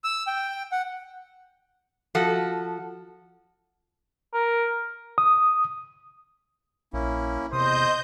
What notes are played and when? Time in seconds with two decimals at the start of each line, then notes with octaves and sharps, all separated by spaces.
0.04 E6
0.27 G5
0.72 F#5
2.15 F3 F#4 A4
4.33 A#4
5.18 D#6
6.93 A#1 A#3 C#4 E4
7.53 E2 C3 C5 D#5 D#6 G6